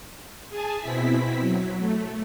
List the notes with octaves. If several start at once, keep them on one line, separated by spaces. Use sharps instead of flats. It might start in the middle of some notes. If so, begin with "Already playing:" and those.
G#4 G#5 A5
B2 C4 E4 B6
F#3
A3